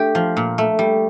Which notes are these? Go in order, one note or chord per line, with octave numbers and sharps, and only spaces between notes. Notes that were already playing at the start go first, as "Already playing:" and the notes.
Already playing: A3 D4 G4
F3
A#2
A3
G3